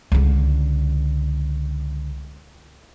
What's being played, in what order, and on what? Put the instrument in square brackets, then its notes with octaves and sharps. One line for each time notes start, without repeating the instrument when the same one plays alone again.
[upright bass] C#2 D3